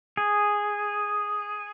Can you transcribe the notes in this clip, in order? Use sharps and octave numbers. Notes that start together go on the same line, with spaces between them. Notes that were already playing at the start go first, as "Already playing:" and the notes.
G#4